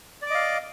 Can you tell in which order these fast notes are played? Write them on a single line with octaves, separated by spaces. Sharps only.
D5 D6 D#5 F5